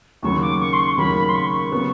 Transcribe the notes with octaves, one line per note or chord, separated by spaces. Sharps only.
D#2 C#3 F#3 A#3 C#6
D6
C#6
C6
C#6
D#2 C#3 F#3 A#3 B5
C6
C#6
C#3 F#3 B3